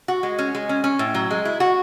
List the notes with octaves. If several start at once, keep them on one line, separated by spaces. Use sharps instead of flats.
F#4
G#3
C#4
G#3
C#4
C#4
A2
F#3
G#3
E4
F#4